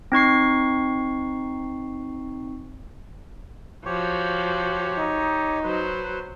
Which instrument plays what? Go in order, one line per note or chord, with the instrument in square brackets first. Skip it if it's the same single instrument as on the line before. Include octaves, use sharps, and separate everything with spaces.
[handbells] C4 D#4 C#6 C7
[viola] F3 F#4 [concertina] G4 C#5
[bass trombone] D#4
[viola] F#3 C5 [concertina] B4